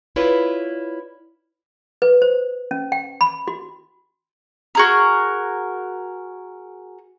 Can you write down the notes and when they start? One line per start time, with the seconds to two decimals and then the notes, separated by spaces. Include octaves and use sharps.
0.16 E4 F4 B4 C#5 D5
2.02 B4
2.22 C5
2.71 C#4
2.92 G5
3.21 B5
3.48 F#4
4.75 F#4 G#4 A#4